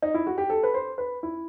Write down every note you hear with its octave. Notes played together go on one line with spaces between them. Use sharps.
D#4
E4
F#4
G4
A4
B4
C5
B4
E4